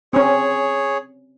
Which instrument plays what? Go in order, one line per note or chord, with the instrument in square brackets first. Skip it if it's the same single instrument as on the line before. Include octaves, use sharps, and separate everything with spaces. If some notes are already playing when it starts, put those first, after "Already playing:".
[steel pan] C4 C#4 [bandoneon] G#4 C#5